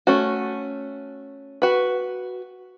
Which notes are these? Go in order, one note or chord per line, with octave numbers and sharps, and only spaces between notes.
A3 C#4 F#4
F#4 B4